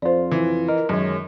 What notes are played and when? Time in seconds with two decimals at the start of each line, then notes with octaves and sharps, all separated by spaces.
0.02 F2 F4 C5 D5
0.31 E3
0.68 A#4 D#5
0.89 F#2 D#3 G#3 C#5